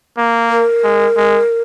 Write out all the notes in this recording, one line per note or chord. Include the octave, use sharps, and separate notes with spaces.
A#3
A#4
G#3
G#3